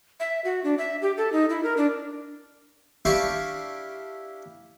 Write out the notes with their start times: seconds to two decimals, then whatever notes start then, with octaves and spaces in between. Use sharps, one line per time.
0.20 E5
0.45 F#4
0.64 D4
0.78 E5
1.02 G4
1.17 A4
1.33 D#4
1.50 E4
1.63 A#4
1.77 D4
3.05 D4 E4 G4 F5 C#6